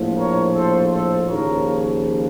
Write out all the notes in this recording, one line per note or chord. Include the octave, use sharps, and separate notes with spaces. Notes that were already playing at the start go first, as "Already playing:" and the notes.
Already playing: A#1 A2 F3
A#4 C#5
A4 C5
A4 C5
D#2 C#3 F3 A#4 C#5